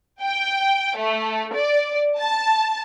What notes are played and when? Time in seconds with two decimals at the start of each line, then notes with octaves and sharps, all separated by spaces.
0.21 G5
0.96 A3
1.54 D5
2.19 A5